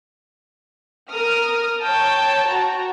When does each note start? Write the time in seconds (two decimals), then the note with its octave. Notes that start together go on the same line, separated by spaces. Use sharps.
1.10 A#4 D#6 F6
1.83 C#5 G5 A5
2.48 F#4 A#5